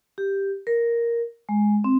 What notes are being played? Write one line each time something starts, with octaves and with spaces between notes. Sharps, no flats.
G4
A#4
G#3
C4